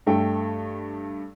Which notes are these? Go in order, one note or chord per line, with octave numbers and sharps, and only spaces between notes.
G2 A3 G5